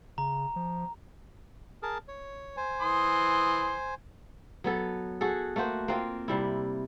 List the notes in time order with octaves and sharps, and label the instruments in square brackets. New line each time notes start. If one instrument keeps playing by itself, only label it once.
[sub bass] C#3 [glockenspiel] A#5
[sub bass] F3
[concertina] G#4 A#4 A5
C#5
C5 G#5
[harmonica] E3 C6 D#6
[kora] F#3 B3 A4
F#4 G#4 A4
A3 A#3 F#4 C5
A#3 C4 F4
C3 G3 E4